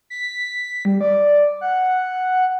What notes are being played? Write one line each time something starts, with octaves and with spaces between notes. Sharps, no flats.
B6
G3
D5
F#5